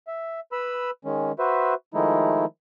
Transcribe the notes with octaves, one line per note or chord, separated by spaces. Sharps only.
E5
B4 B5 E6
D#3 G#3 C#4
F#4 B4 C5 E5
D#3 F3 G#3 A3 D#4 E4